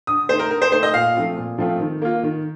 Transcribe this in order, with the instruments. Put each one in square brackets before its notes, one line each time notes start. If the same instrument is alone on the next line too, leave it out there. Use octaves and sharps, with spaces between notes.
[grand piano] D3 [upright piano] D#6
[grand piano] A3 [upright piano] C5
[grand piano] D#4
[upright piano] A#4
[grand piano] D3 [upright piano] A#4
[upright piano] C5
[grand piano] A3 D#4 [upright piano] C5
[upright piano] D#5
[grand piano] A#2 [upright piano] F5
[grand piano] F3 A3 C4 F4
A#2
F3 A3 C4 F4
D#3
A#3 F4
D#3